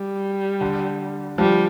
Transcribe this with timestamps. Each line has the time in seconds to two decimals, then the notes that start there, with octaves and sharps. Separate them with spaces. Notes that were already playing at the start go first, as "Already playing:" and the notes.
Already playing: G3
0.61 D3
1.38 F3 G3